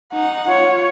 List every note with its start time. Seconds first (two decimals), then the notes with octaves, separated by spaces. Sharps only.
0.13 D#4 F#5
0.49 F4 C#5